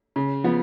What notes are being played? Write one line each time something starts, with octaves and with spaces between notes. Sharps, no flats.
C#3
F3 B3